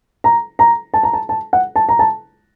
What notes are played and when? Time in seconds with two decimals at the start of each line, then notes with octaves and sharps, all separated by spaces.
0.24 A#5
0.59 A#5
0.94 A5
1.03 A#5
1.13 A5
1.29 A5
1.53 F#5
1.76 A5
1.89 A#5
1.99 A5